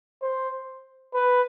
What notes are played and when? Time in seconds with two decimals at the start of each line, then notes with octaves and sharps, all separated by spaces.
0.22 C5
1.14 B4